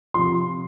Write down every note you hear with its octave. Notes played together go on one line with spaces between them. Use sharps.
C3 F3 C6